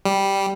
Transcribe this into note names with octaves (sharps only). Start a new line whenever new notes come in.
G3